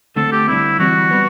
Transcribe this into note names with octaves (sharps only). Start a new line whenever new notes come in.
D3 A3 C4 A4
G4
D3 G3 C4 E4
E3 G3 C4 F#4
G3 B3